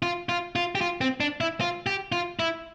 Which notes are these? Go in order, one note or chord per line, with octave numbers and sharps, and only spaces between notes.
F4
F4
F4
G4
F4
C4
D4
E4
F4
G4
F4
E4